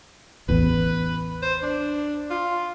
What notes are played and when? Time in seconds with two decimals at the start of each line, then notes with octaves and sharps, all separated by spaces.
0.49 A1 E2 B4
1.42 C5
1.62 D4
2.30 F4